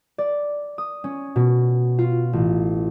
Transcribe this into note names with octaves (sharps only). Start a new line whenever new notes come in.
D5
D#6
C#4
B2
F4
A1